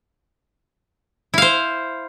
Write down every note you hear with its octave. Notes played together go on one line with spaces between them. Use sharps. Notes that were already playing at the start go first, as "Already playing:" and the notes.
E4 C5 F5